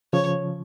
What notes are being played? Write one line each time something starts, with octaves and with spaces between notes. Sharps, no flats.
C#3 F3 C#5